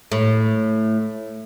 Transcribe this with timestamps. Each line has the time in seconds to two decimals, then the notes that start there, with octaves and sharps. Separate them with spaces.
0.12 A2